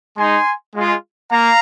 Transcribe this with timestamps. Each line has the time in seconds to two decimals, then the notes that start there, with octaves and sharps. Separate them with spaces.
0.17 G#3 D#4 G#5 C6
0.74 G#3 F4
1.31 A#3 F5 A#5